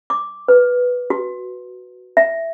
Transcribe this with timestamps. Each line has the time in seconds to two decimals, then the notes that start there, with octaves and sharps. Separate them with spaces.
0.10 D6
0.48 B4
1.10 F#4
2.17 E5